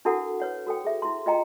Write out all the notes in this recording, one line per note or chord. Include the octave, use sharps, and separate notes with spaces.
D4 E4 F#4 A4 A#4 F#5
B4 C#5 F#5
F#4 A4 G5
G#4 E5
E4 C6
F4 D#5 G5 A#5